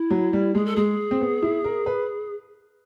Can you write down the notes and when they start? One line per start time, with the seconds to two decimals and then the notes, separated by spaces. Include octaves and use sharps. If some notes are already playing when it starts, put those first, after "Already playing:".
Already playing: E4
0.10 F#3
0.33 G3
0.55 G#3 G#4
0.65 A4
0.76 G#3 G#4
1.11 C4
1.21 B3
1.42 E4
1.64 A#4
1.86 B4